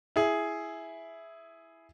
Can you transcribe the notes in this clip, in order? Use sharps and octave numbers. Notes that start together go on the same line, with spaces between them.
E4 G#4